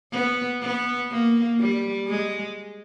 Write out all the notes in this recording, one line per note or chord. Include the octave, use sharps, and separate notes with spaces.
B3
B3
A#3
G3
G#3